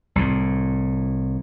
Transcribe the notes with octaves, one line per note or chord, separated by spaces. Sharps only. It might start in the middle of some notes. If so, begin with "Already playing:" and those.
C2 A2